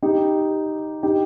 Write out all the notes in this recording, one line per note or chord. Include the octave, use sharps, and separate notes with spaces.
D#4 G4
D#4 G4